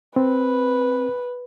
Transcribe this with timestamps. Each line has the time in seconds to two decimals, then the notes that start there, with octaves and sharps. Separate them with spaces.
0.16 C4 B4